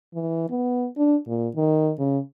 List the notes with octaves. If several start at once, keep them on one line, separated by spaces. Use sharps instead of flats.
E3
B3
D4
A#2
D#3
C#3